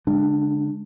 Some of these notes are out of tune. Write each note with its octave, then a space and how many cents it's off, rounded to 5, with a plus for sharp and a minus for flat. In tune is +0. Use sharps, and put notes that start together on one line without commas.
D3 -45 G#3 +0 D4 +20